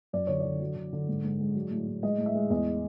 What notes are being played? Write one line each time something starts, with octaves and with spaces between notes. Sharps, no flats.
F#2 D5
D3 C#5
D3 D5
F#3
D3
D3
G#2
G#2
G#3
F#3
A2
A2
G#3 D#5
A2
E5
G#3
E2 D#5